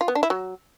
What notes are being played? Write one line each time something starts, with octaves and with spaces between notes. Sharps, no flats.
F4
B3
D4
E4
F#3